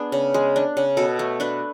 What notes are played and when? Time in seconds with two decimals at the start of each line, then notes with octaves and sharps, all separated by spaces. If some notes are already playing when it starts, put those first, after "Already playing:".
Already playing: B3 D4 G#4
0.12 C#3
0.34 G#3
0.56 D4
0.77 C#3
0.97 B2 A4
1.19 A3
1.40 D4 B4